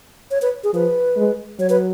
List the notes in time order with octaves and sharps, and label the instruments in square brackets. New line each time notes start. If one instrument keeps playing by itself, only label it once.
[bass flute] C#5
B4
G#4
[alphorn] F3 [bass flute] B4
[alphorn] G#3
[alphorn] F#3 [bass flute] C#5
[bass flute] B4